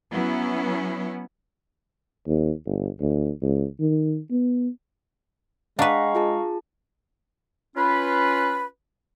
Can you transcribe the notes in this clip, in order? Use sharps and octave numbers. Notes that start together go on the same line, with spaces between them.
F#3 B3 C#4 E4
D#2
G1
D2
C#2
D#3
B3
G#3 D4 B4 F5 F#5 A#5 C#6
F4 G#4 A5
C#4 F4 B4